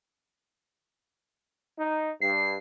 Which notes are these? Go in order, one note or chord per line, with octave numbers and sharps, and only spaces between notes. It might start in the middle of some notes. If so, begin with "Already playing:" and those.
D#4
G2 C7